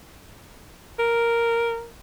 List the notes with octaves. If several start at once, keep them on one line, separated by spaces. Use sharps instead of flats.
A#4